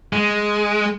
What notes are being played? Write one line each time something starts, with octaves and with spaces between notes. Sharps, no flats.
G#3